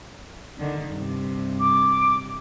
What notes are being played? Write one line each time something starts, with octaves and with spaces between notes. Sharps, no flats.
D3 D#3
G2 C3
D6